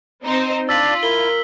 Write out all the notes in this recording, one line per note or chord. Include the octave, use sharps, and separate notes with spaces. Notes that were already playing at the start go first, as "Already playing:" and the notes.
C4 D#4 C5
D4 F4 D5 E6 B6 F#7
E4 A#4 B6 G7